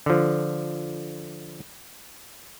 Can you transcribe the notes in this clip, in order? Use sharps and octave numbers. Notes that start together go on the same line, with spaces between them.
D3 F3